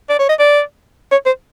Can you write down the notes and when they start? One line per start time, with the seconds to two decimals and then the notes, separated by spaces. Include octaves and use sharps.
0.09 D5
0.19 C#5
0.29 D#5
0.40 D5
1.12 C#5
1.26 C5